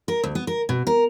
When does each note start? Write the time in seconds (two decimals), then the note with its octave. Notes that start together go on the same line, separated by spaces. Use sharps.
0.08 A#4
0.24 D2
0.35 B3
0.47 A#4
0.69 B2
0.87 A#4